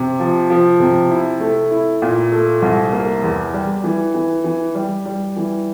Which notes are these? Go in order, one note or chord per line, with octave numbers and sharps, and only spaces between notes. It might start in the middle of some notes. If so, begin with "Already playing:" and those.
Already playing: C3
F3
F3
C3
E4
A3
E4
A#2
A3
C2
A#3
E2
G3
E3
E3
E3
G3
G3
E3